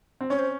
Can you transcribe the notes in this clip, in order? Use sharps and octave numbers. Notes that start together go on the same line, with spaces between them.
C4
C#4 C#5
C5